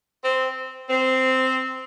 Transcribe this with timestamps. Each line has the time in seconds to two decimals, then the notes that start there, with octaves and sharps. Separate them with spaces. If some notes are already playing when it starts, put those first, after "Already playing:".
0.23 C4
0.90 C4